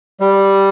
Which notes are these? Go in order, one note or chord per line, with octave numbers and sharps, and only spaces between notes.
G3